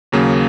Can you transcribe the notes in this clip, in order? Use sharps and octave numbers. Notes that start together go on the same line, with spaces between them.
D#2 C#3 F#3 A#3